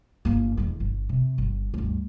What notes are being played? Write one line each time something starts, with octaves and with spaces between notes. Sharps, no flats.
G1 A#3
E2 D3
G1
C3
G1
D2 G2